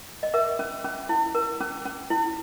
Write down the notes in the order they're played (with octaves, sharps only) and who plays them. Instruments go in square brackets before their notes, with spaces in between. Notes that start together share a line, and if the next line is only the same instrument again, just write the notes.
[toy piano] D#5
A#4 E5
C#4
C#4
E4
A#4
C#4
C#4
E4